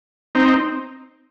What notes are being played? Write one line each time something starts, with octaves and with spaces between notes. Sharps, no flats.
C4 D#4